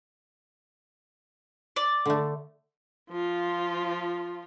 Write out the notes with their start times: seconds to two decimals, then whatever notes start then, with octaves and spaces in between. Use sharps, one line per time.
1.76 D5
2.06 D3 A3
3.10 F3 F4